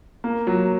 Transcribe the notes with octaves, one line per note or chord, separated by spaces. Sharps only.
A#3
F#3